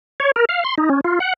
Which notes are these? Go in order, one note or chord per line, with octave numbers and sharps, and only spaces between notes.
C#5
A#4
F5
C6
D#4
C#4
F4
F#5